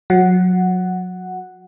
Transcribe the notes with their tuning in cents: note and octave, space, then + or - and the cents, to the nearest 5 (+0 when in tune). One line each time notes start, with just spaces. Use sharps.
F#3 -25 F#5 +0